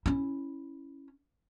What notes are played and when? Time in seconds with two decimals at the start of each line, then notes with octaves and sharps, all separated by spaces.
0.06 C#4 E4